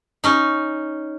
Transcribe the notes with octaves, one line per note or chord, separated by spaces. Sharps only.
C#4 D#4